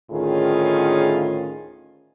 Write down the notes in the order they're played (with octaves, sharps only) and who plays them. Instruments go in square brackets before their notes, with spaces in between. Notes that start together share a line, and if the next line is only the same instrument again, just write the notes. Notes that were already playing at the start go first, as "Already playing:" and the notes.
[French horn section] D2 A2 D#3 C#4 F4 G#4